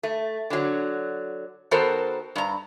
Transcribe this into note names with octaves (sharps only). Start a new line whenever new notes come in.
A3
D3 F#3
D#3 B3 F#4 A4 A#4 C5
G2 A#5